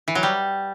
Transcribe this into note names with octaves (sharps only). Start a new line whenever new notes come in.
E3
F#3
G3